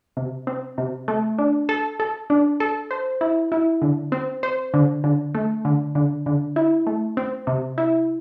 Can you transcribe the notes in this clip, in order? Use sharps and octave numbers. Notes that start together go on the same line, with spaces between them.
C3
C4
C3
A3
D4
A4
A4
D4
A4
C5
E4
E4
D3
C4
C5
D3
D3
A3
D3
D3
D3
E4
A3
C4
C3
E4